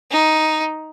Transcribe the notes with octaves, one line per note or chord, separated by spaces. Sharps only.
D#4